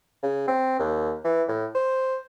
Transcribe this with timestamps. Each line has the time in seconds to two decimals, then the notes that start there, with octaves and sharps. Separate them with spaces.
0.23 C#3
0.48 C4
0.79 D#2
1.24 E3
1.48 A2
1.74 C5